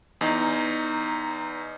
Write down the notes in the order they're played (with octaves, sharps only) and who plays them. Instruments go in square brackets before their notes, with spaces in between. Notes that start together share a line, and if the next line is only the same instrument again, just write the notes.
[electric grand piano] E2 D#4